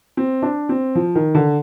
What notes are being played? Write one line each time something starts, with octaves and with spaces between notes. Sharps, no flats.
C4
D4
C4
F3
D#3
D3